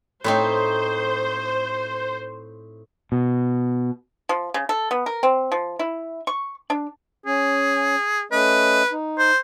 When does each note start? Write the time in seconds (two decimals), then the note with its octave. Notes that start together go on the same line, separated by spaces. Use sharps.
0.24 A2 C4 D#4 C5
3.12 B2
4.29 F3
4.54 C#3
4.69 A4
4.91 B3
5.06 A#4
5.23 C4
5.52 F3
5.79 E4
6.27 C#6
6.70 D4
7.26 C#4 G#4
8.32 A3 C#4 B4 D#5
8.92 D#4
9.18 C5